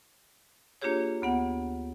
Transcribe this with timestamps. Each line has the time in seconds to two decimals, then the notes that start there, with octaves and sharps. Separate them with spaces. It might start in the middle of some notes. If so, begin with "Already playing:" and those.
0.82 A#3 D4 F4 G4 G#4 C#5
1.22 D2 B3 F#5